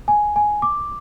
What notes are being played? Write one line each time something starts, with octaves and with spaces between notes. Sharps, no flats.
G#5
G#5
D6